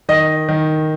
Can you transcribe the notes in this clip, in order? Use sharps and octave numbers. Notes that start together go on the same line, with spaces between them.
D#3 D#5
D#3